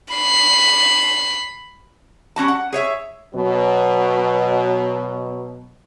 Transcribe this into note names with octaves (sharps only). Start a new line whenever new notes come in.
B5 C7
G3 C#4 F#4 A5
F#5
G#4 C#5 E5
B2 F#3